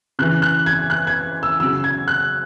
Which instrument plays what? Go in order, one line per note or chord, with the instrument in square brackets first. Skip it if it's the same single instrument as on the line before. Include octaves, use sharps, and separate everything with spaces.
[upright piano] C#3 F#6
E3
F#6
G#6
F#6
G#6
E6
F#3 E6
C#3
G#6
F#6